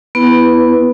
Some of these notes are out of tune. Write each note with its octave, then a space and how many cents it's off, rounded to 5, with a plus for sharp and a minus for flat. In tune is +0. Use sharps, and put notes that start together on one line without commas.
B3 +0 E4 +0 B4 +0